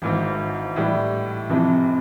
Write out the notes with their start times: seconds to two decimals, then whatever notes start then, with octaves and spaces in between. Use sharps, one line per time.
0.02 G#1 G#2 E3
0.76 A2 E3 G3
1.50 F1 F2 C3 E3